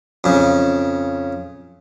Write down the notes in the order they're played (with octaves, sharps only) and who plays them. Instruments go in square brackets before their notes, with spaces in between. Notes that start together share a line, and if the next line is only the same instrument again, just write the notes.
[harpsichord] F2 C#3